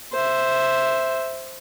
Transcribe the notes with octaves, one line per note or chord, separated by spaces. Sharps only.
C5 E5